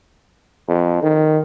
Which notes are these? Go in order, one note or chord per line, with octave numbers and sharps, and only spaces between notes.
F2
D#3